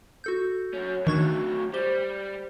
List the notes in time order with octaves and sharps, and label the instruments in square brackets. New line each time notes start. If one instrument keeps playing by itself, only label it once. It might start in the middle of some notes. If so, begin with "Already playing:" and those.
[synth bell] F#4 A4 G6
[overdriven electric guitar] F#3 C#4
[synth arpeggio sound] D#3 [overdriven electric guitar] F#3 A3 [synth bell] D4 C#6 G#6
[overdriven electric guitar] G3 [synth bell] G4 C5 G7